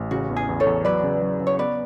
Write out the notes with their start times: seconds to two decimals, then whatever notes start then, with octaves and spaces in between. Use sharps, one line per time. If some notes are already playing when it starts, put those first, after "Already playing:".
Already playing: A1
0.11 C#3 F#4
0.29 E2
0.36 G#4
0.49 E2
0.60 A4 C#5
0.66 E2
0.84 F#3 B4 D5
1.03 C#3
1.21 F#3
1.40 C#3
1.47 C#5
1.58 B3 B4 D5